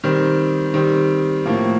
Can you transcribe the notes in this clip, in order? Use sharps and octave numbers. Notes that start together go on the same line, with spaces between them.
D#3 G3 C4
D#3 G3 C4
A2 F3 A#3